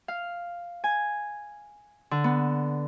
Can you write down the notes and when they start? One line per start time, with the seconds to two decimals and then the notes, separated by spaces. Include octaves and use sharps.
0.08 F5
0.84 G#5
2.11 D3
2.24 B3